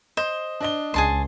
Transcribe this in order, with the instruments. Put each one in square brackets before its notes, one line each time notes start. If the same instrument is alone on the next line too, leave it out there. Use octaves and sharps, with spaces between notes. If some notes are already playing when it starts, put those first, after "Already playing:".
[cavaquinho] C5 [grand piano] D#5
[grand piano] D4 D#5 G7
[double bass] C#2 [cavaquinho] G#4 A5 C6